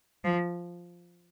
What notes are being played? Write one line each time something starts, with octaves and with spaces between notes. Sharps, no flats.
F3